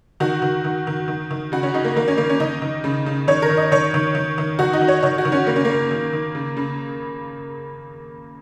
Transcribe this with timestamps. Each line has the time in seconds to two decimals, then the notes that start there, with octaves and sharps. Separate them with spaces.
0.20 D#3 F#4
0.42 D#3
0.65 D#3
0.87 D#3
1.08 D#3
1.31 D#3
1.52 C#3 F#4
1.63 C#4
1.74 C#3 D#4
1.85 A#3
1.96 D#3 A#3
2.08 C#4
2.17 D#3 A#3
2.30 C#4
2.40 D#3 D#4
2.62 D#3
2.84 C#3
3.06 C#3
3.28 D#3 C#5
3.42 A#4
3.50 D#3
3.57 D#5
3.72 D#3 C#5
3.94 D#3
4.15 D#3
4.38 D#3
4.59 D#3 F#4
4.73 D#4
4.81 D#3
4.88 C#5
5.03 D#3 C#5
5.18 F#4
5.25 D#3
5.32 C#4
5.47 C#3 A#3
5.56 C#4
5.65 C#3 A#3
5.91 D#3
6.13 D#3
6.35 C#3
6.57 C#3